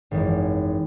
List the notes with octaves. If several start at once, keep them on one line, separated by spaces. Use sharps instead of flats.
G#1 F#2 E3 G#3